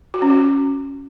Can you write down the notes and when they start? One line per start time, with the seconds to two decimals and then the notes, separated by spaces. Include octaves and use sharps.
0.14 F#4
0.22 C#4
0.30 F#4